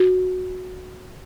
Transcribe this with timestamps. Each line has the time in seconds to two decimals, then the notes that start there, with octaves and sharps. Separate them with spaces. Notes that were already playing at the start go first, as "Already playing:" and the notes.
Already playing: F#4